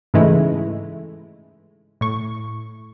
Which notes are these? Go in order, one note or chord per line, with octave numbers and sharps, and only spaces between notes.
G#2 C#3 E3 G#3 A3 E4
A2 C#6